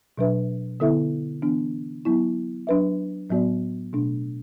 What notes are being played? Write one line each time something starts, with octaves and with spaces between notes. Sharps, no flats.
B2 F#3 D4 B4 E5
D3 B3 E4 A4 E5
E3 B3 D4
F#3 B3 E4
F#3 D4 B4 E5
A2 F#3 B3 F#4 D5
B2 A3 D4